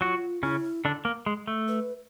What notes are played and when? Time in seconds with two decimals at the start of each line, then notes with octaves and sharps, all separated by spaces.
0.01 F#3 F4 F#4
0.43 C#3 C#4 E4
0.85 D3 D4
1.05 A#3
1.26 G#3
1.47 A3
1.68 B4